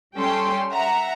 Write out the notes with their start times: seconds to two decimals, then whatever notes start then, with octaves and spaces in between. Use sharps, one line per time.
0.16 G3 C#4 A4 G5 C6
0.73 E5 F#5 A#5